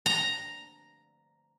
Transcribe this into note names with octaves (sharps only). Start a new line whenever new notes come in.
A#5